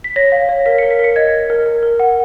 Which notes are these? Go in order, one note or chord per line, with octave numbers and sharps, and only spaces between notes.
B6
C#5 A#6
F5
C#5
A#4 B6
A#4 C#7
B6
A#4 C#7
D#5 G#6
D#5
A#4
A#4
A#4
F#5